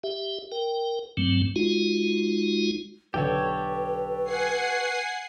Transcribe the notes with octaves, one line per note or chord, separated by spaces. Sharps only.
G4 E5
A#4 G5
G2 F#3 A3 C4
G#3 D#4 F4 F#4
B1 D3 G4 A4 B4 C#5
F#5 G#5 C7